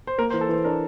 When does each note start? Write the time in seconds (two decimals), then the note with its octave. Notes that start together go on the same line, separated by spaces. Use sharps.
0.07 C5
0.18 A#3 A#4
0.30 C5
0.34 E3
0.41 A4
0.49 E3 C5
0.65 D4 A#4